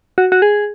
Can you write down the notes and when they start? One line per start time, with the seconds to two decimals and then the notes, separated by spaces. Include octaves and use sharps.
0.18 F#4
0.32 F#4
0.42 G#4